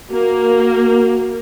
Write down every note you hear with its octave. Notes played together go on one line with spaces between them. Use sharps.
A#3 F#4